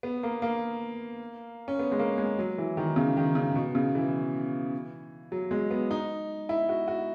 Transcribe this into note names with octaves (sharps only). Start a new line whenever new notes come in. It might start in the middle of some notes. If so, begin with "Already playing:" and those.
B3
A#3
A#3
C#4
B3
G#3
A#3
G#3
F#3
E3
D#3
C#3
D#3
C#3
B2
C#3
E3
F#3
G#3
B3
D#4
E4
F#4
F#4